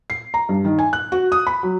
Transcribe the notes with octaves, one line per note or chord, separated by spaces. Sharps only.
C7
A#5
G2
D#3
G#5
F#6
F#4
D#6
B5
F#3